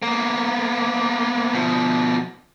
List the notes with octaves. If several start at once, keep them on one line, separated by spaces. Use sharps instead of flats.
A#3 B3
B2 F3